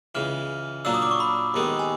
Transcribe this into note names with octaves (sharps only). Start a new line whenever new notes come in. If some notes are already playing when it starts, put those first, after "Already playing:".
C#2 C#3 E3 F6
A#2 F#3 A#3 D4 E6
D#6
D6
C#6
B5
D#2 D#3 G#3 B3
G#5